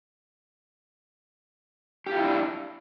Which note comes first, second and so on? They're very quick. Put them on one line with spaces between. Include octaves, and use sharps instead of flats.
G4 F4 E4 D4